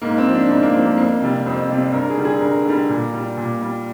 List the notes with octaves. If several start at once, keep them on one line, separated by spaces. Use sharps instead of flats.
G#2 A#3
C4
F3
D4
G#2 C4
A#3
F3 C4
A#3
F2 A#3
C3 G3
F2 C4
C3 G3
G2 A#4
G#4
D3 G3
G#4
G2 A#4
D3 G3
A#2
G3
A#2
G3